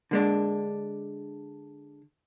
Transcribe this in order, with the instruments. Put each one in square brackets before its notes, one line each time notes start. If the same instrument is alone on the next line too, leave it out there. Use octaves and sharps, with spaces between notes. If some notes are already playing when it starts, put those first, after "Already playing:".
[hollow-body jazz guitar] D3 G#3 D4